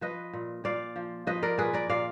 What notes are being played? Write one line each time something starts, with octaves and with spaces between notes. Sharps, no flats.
F3 B4 D#5
A#2
A#2 D5 F5
F3
F3 B4 D#5
A#4 D5
A#2 G#4 B4
A#4 D5
A#2 D5 F5